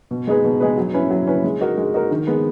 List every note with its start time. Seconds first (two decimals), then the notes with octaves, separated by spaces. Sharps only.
0.11 B2
0.27 G#3 D#4 G#4 B4
0.44 B2
0.60 G#3 D#4 G#4 B4
0.77 F#3
0.94 C#4 E4 B4
1.10 F#3
1.27 C#4 E4 B4
1.44 G#3
1.61 D#4 F#4 A#4
1.77 G#3
1.94 D#4 F#4 A#4
2.11 D#3
2.27 G#3 B3